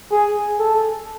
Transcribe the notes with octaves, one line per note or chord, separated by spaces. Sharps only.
G#4
A4